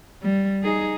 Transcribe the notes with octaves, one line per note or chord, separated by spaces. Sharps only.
G3
D#4 G#4